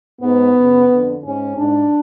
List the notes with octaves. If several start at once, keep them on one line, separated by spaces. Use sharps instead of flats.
G#2 B3
F#2 C#3
F2 D3
G#2 C#4
G#2 D4